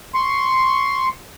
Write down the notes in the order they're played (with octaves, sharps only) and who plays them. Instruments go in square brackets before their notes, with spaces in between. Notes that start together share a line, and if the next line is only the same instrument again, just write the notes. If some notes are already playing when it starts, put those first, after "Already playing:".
[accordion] C6 C#6